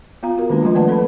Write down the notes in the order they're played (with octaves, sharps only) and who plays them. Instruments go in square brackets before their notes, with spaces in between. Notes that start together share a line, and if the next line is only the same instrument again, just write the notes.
[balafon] B3 F4 F5 A#5
F#4 A#4
D#3 G#3 A#3 C#4 D4 F4
F3 G3 A3 F4 D#5 C6
D#3 A3 B4 D5 F#5 A5
C4 A4 B4 B5